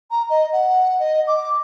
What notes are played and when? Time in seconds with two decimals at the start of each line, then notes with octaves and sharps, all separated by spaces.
0.11 A#5
0.30 D#5
0.52 F#5
0.99 D#5
1.28 D6